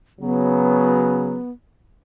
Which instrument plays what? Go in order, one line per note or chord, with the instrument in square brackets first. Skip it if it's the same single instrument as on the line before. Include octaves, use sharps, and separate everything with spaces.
[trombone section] C#3 F#3 [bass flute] B3